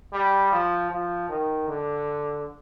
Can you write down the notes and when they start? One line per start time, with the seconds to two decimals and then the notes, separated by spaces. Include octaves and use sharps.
0.13 G3
0.52 F3
0.91 F3
1.29 D#3
1.68 D3